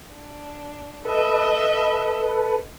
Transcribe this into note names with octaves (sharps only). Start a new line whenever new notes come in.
D4
A4 B4 D#5 E5